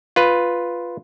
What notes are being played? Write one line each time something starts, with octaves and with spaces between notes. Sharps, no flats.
F4 B4